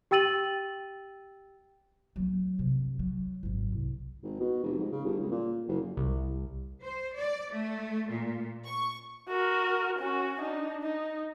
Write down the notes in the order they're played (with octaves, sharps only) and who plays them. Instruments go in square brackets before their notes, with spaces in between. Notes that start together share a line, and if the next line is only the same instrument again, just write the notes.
[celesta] G4 G5 E6 A6 D#7 F#7
[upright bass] F#3 A3
G2 C3
F#3
G#1 F#2
C2
[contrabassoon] G#1
B2
F1
G#2
C#3
G1
C#2
A#2
F#1
[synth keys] C2
[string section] C5
D5
A3
A#2
C#6
[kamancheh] F#4 A#4
C#4 F#4
D4 D#4
D#4